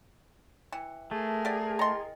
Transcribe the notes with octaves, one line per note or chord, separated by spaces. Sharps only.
E3 G5
A3 G#4 A#4 A5
G4 D5 F#5
E4 D#5 G5 A#5 C6